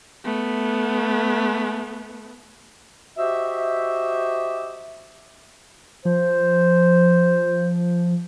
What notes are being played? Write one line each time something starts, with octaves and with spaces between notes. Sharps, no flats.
A3 B3
F#4 G4 C5 D#5 E5
F3 C5